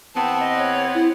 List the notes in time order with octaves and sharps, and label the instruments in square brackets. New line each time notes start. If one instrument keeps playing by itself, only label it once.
[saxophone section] E2 B3 C4 [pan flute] A5
[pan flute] D#5
C#5
E4